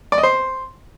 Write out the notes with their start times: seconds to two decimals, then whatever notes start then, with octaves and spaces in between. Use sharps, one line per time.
0.12 D5
0.18 D#5
0.23 C5